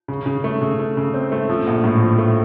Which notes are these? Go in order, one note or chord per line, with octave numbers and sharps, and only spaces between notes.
C#3
C#3
A3
C#3
A3
C#3
C4
A3
F3
A#1
A2
F3
A3